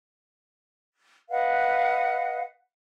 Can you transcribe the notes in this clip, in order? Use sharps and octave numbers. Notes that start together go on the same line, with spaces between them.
B4 D#5 F5 F#5